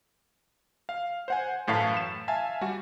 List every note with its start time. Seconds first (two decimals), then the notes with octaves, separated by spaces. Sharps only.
0.89 F5
1.28 C5 F#5 G#5
1.67 F#2 A2 E3 F5 A5 B6
1.97 E7
2.28 E5 F5 G#5 A5
2.61 G3 F#4